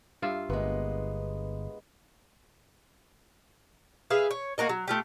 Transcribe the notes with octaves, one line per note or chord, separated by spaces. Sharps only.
G2 F4 E5
G1 G#3 A#3 B3
G#4 B4 E5 F5
C#5
A#3 F#4 A#4 D#5
F#3
A3 F4 G4